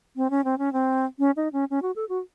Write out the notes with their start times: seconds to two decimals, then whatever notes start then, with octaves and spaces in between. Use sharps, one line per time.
0.16 C4
0.30 C#4
0.44 C4
0.58 C#4
0.73 C4
1.19 C#4
1.36 D#4
1.53 C#4
1.70 C#4
1.82 F#4
1.96 A4
2.09 F#4